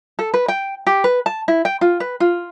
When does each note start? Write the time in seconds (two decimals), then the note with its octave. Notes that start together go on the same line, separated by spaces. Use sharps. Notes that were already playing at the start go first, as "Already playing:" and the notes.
0.19 A4
0.34 B4
0.48 G5
0.87 G4
1.04 B4
1.26 A5
1.48 E4
1.65 G5
1.81 F4
2.00 B4
2.20 F4